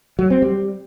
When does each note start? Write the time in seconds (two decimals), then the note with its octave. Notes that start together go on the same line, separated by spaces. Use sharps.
0.19 F#3
0.30 C4
0.42 G3